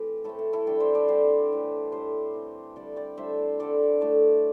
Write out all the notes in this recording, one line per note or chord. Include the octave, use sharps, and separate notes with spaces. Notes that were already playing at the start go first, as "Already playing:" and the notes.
Already playing: E3 A3 C4 G4
A2 A3 C4 E4 A4
E4
E4 A4
D3 G3 D4 D5 G5
C5 E5
A4 D5
D3 G3 C4 G4 C5
A2 E3 C4
A2 A3 D4 G4 C5
E3 C4
D3 G3 D4 A4 D5
D5 G5
A2 G3 D4 C5 E5
D3 G3 D4 A4 D5
A2 A3 C4 A4 D5